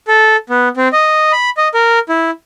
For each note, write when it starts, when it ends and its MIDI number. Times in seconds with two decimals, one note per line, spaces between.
0.08 0.36 69
0.50 0.68 59
0.77 0.88 60
0.93 1.32 75
1.32 1.50 83
1.57 1.68 75
1.74 1.99 70
2.09 2.31 64